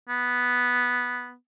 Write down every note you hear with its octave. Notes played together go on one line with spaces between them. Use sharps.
B3